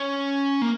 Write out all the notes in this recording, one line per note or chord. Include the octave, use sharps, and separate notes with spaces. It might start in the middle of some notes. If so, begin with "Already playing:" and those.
Already playing: C#4
A#3